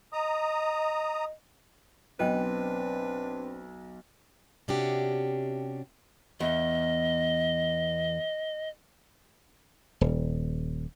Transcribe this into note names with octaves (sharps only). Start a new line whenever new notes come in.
D#5 A#5 D#6
B1 C4 D4 B4 D#5 G5
C3 C#4 D4 F#4 G4
E2 D#5
D#1